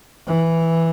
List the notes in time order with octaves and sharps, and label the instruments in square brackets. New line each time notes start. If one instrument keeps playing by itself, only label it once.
[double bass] E3